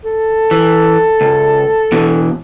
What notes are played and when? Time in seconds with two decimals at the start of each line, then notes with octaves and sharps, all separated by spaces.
0.05 A4
0.51 E3
1.21 C#2
1.92 B2 E3